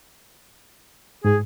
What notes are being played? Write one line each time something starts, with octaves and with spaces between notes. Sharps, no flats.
G#2 G#4